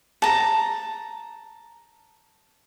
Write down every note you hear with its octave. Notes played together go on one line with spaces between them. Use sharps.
A5 A#5